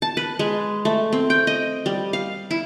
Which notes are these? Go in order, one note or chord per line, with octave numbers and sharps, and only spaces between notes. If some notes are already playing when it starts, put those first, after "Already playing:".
A5
B4
G#3
A3
C4
G5
D#5
G3
F5
E4